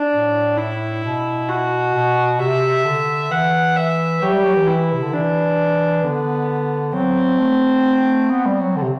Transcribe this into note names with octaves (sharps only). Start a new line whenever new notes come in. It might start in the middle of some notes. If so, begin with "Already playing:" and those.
Already playing: D4
A2
E4
B2
F#4
B2
C3 E5
D3
E3 F#5
E5
F#3 G4
G3
F#3
E3
E4
C3
D3
E3 D4
D3 B3
F#3 C4
A3
B3
G3
F#3
D3
C3